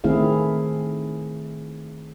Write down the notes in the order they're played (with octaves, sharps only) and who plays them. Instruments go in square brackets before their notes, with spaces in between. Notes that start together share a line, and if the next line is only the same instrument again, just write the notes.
[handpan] D#3 A3 C4 E4 G#4 F5